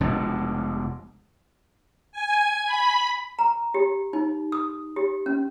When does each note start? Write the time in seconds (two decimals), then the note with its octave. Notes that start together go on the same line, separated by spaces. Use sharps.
0.01 F1 B2 G#3 D4
2.12 G#5
2.66 B5
3.39 A#5
3.74 G4
4.13 D#4
4.52 D#6
4.96 G4
5.26 C#4